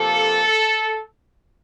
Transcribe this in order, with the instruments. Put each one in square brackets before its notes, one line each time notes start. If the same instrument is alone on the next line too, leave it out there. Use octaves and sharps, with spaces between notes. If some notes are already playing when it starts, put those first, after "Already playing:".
Already playing: [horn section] C3 F3 A#3 A4